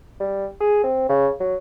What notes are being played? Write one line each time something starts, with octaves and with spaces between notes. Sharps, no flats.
G3
G#4
C4
C#3
F#3